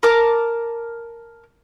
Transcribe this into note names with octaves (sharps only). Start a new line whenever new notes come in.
A#4 A5 D6